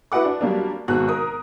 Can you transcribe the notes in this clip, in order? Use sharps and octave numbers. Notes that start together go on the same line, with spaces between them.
E4 F#4 B4 F#5 D6
D4
F#3 G3 A#3 D4
G#1 B2 F#4 F#6
A#4 D#6